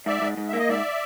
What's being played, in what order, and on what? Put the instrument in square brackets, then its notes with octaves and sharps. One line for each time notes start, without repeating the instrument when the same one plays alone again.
[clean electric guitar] G#2 [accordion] D5 E5
[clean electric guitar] G#2
G#2
[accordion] E5
[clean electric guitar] A#3
[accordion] D#5
[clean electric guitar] G#2 [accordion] D5 E5